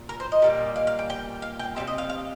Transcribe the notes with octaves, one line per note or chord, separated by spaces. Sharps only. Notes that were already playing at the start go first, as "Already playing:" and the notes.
Already playing: A#2
A#4
C5
D#5
A#2 G3 A#3
F5
F5
G5
G5
F5
G5
C3 G3 C4 F5
D#5
F5
F5